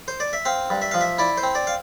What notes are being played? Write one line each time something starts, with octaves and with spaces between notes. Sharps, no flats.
C5
D5
E5
C4 F5
G2
E5
F3 F5
E5
E4 D5
C5
C4
D5
F5